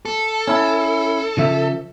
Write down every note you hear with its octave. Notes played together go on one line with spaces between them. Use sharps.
A4
C#4 E4
C#3 F3 E5